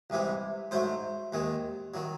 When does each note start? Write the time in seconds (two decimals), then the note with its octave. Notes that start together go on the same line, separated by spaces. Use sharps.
0.10 C2 C3 E3 G#3
0.71 G#2 F#3 A3 C5
1.32 D#2 D#3 G#3
1.94 D#3 F#3